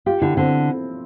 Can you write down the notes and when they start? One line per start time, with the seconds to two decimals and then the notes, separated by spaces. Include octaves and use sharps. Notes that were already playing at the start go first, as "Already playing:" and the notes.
0.06 F4 G4
0.21 D3 E4
0.37 D3 C4